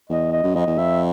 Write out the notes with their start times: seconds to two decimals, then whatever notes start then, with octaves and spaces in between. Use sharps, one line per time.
0.09 E2 D#5
0.32 D#5
0.44 F#2
0.55 F2 D#5
0.67 E2
0.78 F2 E5